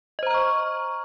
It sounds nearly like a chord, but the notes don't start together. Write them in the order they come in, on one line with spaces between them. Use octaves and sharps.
D#5 C5 A#5 F6 C#6